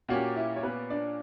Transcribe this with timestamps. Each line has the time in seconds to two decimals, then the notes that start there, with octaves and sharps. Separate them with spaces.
0.08 A#2 A#3 C#4 F#4 G4 F#5
0.36 E4 E5
0.56 C#5
0.63 B3 B4
0.90 D4 D5